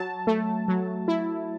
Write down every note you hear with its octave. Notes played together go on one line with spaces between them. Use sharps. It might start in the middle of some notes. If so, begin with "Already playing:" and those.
Already playing: F#3 A5
A3
F#3
E4